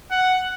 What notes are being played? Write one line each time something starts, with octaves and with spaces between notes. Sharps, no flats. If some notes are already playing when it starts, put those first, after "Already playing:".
F#5